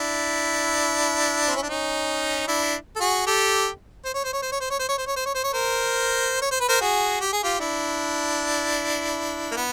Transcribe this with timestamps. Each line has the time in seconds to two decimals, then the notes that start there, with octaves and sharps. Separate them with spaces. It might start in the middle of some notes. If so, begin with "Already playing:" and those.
Already playing: D4 E4
1.48 C4
1.55 C#4
1.62 D4
1.69 C#4 D#4
2.47 D4 E4
2.96 A4
3.00 F#4 G#4
3.27 G4 A4
4.05 C5
4.14 C#5
4.24 C5
4.33 C#5
4.42 C5
4.52 C#5
4.61 C5
4.70 C#5
4.79 C5
4.89 C#5
4.98 C5
5.07 C#5
5.16 C5
5.25 C#5
5.35 C5
5.44 C#5
5.53 A#4 C5
6.41 C#5
6.51 C5
6.60 B4
6.69 A#4 C5
6.81 F#4 G#4
7.21 G4
7.32 G#4
7.43 F4 G4
7.60 D4 E4
9.51 A#3
9.57 B3